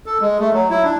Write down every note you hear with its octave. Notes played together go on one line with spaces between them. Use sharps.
A4
G#3
A3
F#3
E4
D4